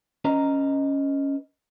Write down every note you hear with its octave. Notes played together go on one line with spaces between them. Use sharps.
C#4 B4 D#5 A#5